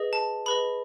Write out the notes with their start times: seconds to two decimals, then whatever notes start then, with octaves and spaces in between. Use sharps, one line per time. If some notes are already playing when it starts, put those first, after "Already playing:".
Already playing: G#4 B4 D#5
0.13 A5
0.46 G#4 B4 D#5 B5